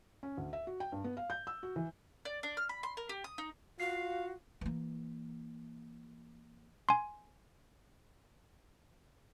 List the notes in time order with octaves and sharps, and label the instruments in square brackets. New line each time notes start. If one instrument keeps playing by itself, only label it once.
[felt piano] C#4
D2
E5
F#4
G5
G2
B3
F5
G6
E6
F#4
E3
[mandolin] D5
D4
F6
B5
C6
A#4
G4
D#6
D#4
[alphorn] F4 [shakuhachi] F#4 [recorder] F5 [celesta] C7
[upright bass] E3 A#3
[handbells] G#5 C6